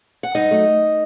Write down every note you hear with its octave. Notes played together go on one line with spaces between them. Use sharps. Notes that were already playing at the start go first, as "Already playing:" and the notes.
F#5
G2 D#4 D#5
F#3 A3